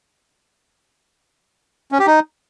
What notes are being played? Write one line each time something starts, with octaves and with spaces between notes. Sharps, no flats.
C#4
G4
D#4